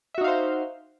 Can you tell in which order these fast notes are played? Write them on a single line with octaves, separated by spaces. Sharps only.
E5 F#4 D#4 F5 C5